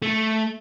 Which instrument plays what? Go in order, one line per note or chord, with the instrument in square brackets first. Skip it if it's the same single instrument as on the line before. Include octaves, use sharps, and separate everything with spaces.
[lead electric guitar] A3